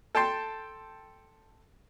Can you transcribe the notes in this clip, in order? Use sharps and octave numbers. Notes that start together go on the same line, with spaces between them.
A4 G5 A5 C6